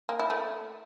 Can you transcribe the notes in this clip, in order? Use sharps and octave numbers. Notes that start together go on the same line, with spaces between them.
A#3
E4
A3